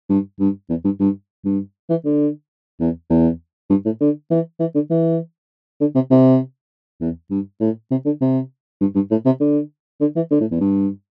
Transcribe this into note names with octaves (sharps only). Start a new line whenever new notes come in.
G2
G2
E2
G2
G2
G2
E3
D3
E2
E2
G2
A2
D3
E3
E3
D3
E3
D3
C3
C3
E2
G2
A2
C3
D3
C3
G2
G2
A2
C3
D3
D3
E3
D3
A2
E2
G2